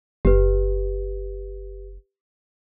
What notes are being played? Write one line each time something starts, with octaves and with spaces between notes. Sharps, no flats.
F#1 G4 B4